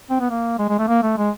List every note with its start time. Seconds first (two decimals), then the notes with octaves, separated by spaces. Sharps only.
0.10 C4
0.20 B3
0.30 A#3
0.58 G#3
0.69 G#3
0.79 A3
0.88 A#3
1.03 A3
1.17 G#3